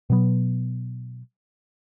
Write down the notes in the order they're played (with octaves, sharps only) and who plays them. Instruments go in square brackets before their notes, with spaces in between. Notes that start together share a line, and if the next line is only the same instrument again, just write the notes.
[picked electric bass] B2 F#3 B3